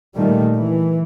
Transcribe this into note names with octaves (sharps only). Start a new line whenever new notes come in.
A#2 D#3 G3 A3
E3